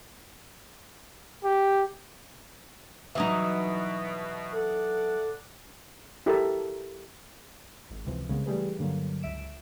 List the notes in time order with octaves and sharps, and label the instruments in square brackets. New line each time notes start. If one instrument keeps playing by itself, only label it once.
[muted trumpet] G4
[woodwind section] B2 [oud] E3 F#3 D#4 [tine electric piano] E5 D#6
[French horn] A4 [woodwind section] D5 F#5
[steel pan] E4 G4 A4 A#4 E5 A5
[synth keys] G#1
C#2 C3 E3 F3
C2 C#3 G#3 A#3 B3
E3 G3 A3 G4 G#4 B4
G2 D3 F#3 A#3
C#2 E5 D7 E7